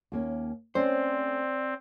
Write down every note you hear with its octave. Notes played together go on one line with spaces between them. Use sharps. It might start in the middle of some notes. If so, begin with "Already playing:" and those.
D#2 A#3 C#4
A3 C4 C#4 C5 D5